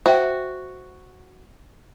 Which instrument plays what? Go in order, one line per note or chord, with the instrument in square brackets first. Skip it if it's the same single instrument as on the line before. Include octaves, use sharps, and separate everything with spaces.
[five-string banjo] F#4 [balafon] C5 E5 G5